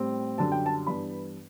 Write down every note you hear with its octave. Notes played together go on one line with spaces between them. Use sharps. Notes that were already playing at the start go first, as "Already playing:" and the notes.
Already playing: A2 G3 C4
F#2 D3 G3 A5
G5
A5
G2 E3 B3 D4 B5